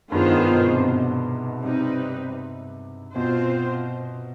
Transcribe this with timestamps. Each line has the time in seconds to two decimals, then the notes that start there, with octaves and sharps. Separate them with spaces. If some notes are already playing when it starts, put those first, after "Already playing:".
0.12 G2 D#3 B3 F4 G#4 C5
0.31 G#2
0.50 B2
0.69 C3
0.88 B2
1.64 C3 G3 C4 D#4 B4
3.15 B2 C4 F4 C5